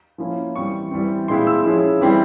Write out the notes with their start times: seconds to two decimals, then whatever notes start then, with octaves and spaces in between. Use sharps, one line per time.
0.18 F3 A#3 C#4 E4
0.55 E3 G3 C4 C#6
0.91 E3 G3 C4
1.28 A#2 G#3 C4 E4 C6
1.47 E6
1.65 F3 G#3 C#4 E4
2.01 E3 G3 C4 E4